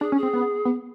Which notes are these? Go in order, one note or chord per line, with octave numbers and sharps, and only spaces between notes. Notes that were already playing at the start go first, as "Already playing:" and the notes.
D4 G#4
C#4
G#4
C4
B3
B3